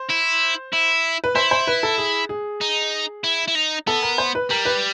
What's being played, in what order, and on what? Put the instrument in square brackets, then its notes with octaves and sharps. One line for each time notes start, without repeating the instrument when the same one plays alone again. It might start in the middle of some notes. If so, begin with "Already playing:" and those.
Already playing: [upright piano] C5
[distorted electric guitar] E4
E4
[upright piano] B4
[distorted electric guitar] E4 [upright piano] C5
[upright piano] C5
B4
A4
G#4
G#4
[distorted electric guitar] D#4
E4
E4
D#4
[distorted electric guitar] B3 [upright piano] A4
[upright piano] A#4
C5
B4
[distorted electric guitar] G3 [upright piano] A#4
[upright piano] B4